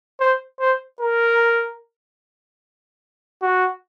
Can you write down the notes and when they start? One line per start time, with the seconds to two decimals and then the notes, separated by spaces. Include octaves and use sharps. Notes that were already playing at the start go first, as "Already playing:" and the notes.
0.20 C5
0.60 C5
1.00 A#4
3.42 F#4